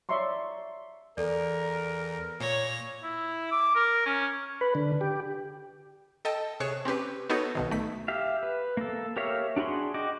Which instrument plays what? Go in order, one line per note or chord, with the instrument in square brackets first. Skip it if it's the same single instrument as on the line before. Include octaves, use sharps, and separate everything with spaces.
[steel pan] C#5 D5 E5 A#5 C6 C#6
[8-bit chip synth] E2 [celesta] A4 D5 [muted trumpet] A#4
[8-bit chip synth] A#2 A#6 [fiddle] C#5
[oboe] E4
D6
A#4
C#4
[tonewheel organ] B4
D3
G4
[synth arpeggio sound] A4 D#5 G5 A5
C3 G#4 C#5 C#6 F#6 E7
C4 C#4 G4 B4
B3 D#4 F#4 A4 B4 C#5
B1 B2 D#3
A3 B6
[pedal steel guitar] G4 E5 F5
B4
A#3 A4
G4 A#4 C#5 E5 F5
D4 F#4 G#4 B5 C6
F#4 D#5 G5 D6